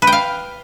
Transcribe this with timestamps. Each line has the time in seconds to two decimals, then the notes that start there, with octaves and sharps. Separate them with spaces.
0.02 B4
0.07 G5
0.12 F5